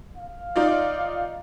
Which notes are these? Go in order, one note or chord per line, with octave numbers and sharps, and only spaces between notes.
F5
D#4 F4 D5